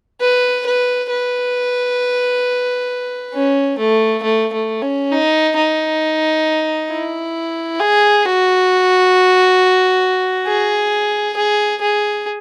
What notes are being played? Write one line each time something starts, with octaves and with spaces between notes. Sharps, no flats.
B4
B4
B4
C#4
A3
A3
A3
C#4
D#4
D#4
E4
G#4
F#4
G#4
G#4
G#4